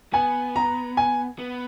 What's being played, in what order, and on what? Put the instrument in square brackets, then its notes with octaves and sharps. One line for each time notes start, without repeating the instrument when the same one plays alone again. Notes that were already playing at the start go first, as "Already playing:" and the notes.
[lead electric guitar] B3 [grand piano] G#5
[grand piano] A#5
G#5
[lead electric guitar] B3